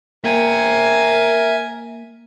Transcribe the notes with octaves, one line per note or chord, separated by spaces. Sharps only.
A#3 A#4 E5 G5 G#5